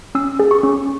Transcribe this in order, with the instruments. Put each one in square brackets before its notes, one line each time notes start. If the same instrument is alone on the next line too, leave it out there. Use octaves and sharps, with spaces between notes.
[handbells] C#4 E6
G#4
C#6
C#4